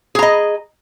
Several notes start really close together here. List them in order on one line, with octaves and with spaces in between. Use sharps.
G#4 A#5 D#5